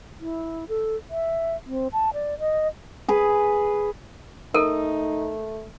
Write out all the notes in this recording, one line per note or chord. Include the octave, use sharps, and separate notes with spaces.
E4
A4
E5
C4
A5
D5
D#5
G#4 B4
A3 D#4 A4 A#4